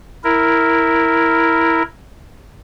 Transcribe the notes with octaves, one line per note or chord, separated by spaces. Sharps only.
E4 A#4